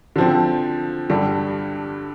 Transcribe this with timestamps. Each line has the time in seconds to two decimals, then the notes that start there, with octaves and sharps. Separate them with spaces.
0.16 D3 F3 C4
1.10 G2 D3 G3